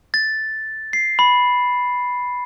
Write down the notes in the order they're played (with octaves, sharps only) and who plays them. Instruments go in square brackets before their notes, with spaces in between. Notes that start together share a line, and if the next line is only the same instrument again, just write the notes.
[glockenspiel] A6
C7
B5